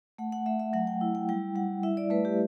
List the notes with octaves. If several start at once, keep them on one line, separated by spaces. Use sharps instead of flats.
A3 F#5
F#5
A3 E5
E5
F#3 F#5
G5
E4
G5
G3 G5
G3 F#5
E4 E5
D5
A3 B4
G4